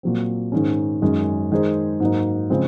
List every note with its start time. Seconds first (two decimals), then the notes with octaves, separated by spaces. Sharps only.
0.03 A#2 F#3 C4
0.52 G#2 D#3 G#3 C#4
1.02 F#2 D#3 G#3 C#4
1.52 D#3 G#3 D#4 G#4 C5
2.00 G#2 F#3 A#3 D#4
2.50 C#3 F3 G#3 C4